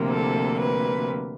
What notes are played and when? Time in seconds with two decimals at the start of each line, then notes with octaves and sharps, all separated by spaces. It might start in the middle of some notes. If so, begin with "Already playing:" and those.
Already playing: D2 C3 F3 A#3
0.09 A4
0.60 B4